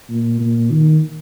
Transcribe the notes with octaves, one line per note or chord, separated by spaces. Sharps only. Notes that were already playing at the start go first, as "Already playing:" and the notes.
A#2
A#2
D#3